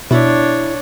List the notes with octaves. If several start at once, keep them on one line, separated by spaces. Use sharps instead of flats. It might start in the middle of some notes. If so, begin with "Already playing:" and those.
B2 D4 E4 C#5